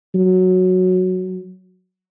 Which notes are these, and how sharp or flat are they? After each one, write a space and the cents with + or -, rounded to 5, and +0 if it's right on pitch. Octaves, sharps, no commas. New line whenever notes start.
F#3 -5